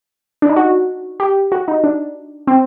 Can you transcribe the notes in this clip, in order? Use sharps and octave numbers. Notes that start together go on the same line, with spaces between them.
D4
D#4
F#4
G4
F#4
D#4
D4
C4